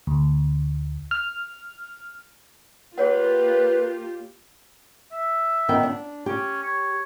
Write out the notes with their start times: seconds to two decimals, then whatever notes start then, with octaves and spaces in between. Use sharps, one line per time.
0.07 D2
1.11 F6
2.98 A#3 F4 G4 G#4 B4 C#5 F#5
5.12 E5
5.69 D#3 B3 G5
5.83 D4
6.26 C#4 G4
6.63 C#5